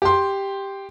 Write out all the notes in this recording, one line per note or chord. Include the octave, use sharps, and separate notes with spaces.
G4 C6